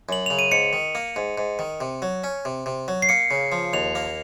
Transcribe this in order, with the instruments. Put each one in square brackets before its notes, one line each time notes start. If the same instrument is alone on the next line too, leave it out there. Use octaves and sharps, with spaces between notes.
[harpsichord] F#2 [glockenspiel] F#7
[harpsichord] C#3 [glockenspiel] F7
[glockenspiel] D#7
[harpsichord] G#2 [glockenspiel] C#7
[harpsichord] D#3
A#3
G#2
G#2
D#3
C3
F#3
C#4
C3
C3
F#3
[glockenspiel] C7
[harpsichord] A#3 [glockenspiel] C#7
[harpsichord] C#3
F3
[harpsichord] D#2 [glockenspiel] F7
[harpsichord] A#3